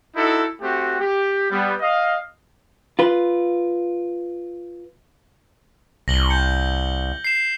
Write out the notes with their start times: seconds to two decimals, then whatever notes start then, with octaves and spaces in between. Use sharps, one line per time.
0.16 D#4 E4 F#4 A4
0.62 A3 C4 F#4 G4
1.00 G4
1.51 G3 B3
1.81 D#5 F5
2.99 F4 B4
6.08 C2 A#6 F#7 G7
6.30 G6 C#7
7.24 C7 E7